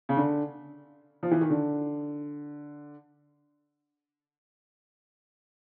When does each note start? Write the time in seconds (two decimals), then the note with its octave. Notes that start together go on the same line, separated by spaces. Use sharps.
0.09 C#3
0.17 D3
1.23 F3
1.31 E3
1.41 D#3
1.50 D3